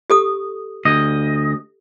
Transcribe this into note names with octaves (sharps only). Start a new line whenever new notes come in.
G4 A4 D#6
D2 D#5